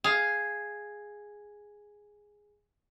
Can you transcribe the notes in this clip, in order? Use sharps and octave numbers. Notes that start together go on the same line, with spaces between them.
G#4 F5